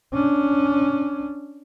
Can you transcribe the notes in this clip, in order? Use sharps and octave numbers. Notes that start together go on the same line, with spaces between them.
C#4 D4